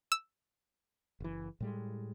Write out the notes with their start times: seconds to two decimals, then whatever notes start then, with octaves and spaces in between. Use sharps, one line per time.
0.12 E6
1.20 F#1 E3
1.60 A2 G3 G#3